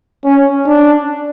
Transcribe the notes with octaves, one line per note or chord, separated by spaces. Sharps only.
C#4
D4